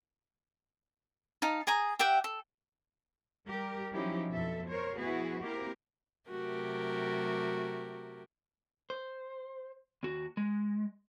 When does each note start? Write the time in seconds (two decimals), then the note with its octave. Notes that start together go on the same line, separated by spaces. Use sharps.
1.42 D#4 F5 A5
1.67 G#4 G#5 A#5 D#6
1.99 G4 E5 F#5 G5
2.24 A4
3.47 G3 G4 A#4
3.92 F3 F#3 C#4 D#4 E4 G4
4.32 F2 B2 A4 E5
4.68 A#4 C5 C#5
4.99 F3 B3 E4 F#4 G#4 B4
5.41 A#3 C4 E4 G4 A#4
6.29 C3 F#3 A3 F#4 G4 A#4
8.90 C5
10.03 D#2 F#4
10.37 G#3